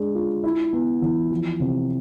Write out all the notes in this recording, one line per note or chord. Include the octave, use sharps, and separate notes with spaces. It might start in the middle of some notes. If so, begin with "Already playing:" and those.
Already playing: G#3 D4
F4
E4
B3
E3
F3
C3